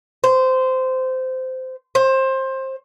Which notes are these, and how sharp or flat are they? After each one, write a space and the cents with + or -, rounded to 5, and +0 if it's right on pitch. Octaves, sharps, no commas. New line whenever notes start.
C5 -15
C5 +20